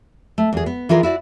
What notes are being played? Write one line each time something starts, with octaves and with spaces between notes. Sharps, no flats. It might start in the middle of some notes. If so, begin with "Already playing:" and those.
A3
E2 G#4
B3
E3 F4 G#4 A#4 D5
E4 F#4 D5